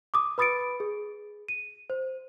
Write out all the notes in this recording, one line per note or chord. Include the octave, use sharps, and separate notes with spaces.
D6 D#6
B4 B5 D#6 A6 C#7 D7
G#4
D#7
C5